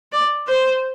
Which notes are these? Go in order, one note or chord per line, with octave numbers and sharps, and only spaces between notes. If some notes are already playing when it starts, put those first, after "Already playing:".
D5
C5